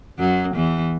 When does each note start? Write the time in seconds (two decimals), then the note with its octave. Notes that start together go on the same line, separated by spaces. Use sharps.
0.19 F#2 F#3
0.55 E2 E3